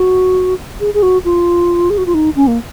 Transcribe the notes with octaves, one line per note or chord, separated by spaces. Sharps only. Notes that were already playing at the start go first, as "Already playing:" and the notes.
Already playing: F#4
G#4
G#4
F#4
F4
G#4
F#4
F4
D#4
C#4
A#3